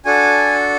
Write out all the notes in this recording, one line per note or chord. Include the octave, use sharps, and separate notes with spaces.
D4 F#4 A4 G#5